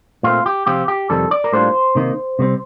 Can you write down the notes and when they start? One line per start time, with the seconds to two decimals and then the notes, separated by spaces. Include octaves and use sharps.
0.23 A#2 A3 C4 F4
0.46 G4
0.67 C3 F3 C4 F4 G4
0.88 G4
1.10 F2 C3 D#3 G3 A4
1.31 D5
1.44 A#4
1.53 A2 G3 A#3 D4 F4 C5
1.95 C3 D#3 A#3 D#4
2.39 C3 G3 C4